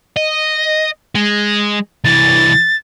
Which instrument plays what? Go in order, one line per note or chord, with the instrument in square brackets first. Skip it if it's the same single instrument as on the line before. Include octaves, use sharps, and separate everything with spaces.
[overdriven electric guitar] D#5
G#3
[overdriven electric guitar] C2 E3 [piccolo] A6